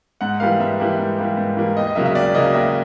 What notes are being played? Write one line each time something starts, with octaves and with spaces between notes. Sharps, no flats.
G#2 F#5
E3 G3 A#3 F5
G#2 E5
E3 G3 A#3
G#2
E3 G3 A#3
G#2
E3 G3 A#3
D#2 D#5
D#5
C#3 F#3 A#3 E5
E5
D#2 D5
C#3 F#3 A#3 D#5
D#2 E5